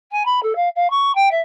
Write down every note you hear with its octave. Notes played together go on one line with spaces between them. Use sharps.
G#5
B5
A4
F5
F5
C#6
G5
E5